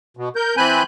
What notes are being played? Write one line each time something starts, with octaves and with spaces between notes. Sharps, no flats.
B2
A#4 G6
E3 C4 G#5 B5 F#6 G6